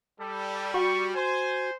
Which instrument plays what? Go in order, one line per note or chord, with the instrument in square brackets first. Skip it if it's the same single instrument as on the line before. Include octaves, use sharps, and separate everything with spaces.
[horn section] G3 [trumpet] A4
[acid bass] F#4 [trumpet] C#6
[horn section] C5 [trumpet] G#5